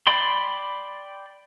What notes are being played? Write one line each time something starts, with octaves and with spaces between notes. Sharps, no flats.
D5 G5 B5 C6